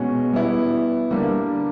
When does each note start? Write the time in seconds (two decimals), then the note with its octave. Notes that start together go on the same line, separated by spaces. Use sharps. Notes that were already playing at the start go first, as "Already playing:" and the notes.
Already playing: B2 G#3 C#4 F#4
0.32 G3 B3 E4
1.11 D3 G3 A#3